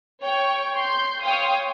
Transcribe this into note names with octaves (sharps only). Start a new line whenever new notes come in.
C#5 G5 C#6
C6 G6
C#5 F5 G5 C6 D#6